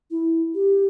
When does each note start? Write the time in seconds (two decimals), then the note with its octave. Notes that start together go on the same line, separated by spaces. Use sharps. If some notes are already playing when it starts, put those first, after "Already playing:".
0.11 E4
0.55 G4